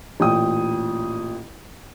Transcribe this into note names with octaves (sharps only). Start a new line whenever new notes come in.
A1 A#2 G5 D#6